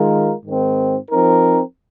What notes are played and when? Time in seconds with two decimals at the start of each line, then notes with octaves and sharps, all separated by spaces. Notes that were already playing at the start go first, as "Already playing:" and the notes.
Already playing: D#3 G#3 F4 A#4
0.45 G#2 D#3 C4
1.09 F3 C4 D#4 A#4